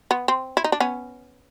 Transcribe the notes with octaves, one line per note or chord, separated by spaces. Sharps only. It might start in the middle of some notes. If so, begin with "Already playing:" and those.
B3
C4
E4
D#4
D4
B3 C#4